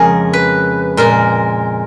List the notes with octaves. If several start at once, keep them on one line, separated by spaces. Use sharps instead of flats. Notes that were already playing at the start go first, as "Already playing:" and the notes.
Already playing: F2 C#3 G#3 G#4 A#4
B4
A#2 G#3 A#4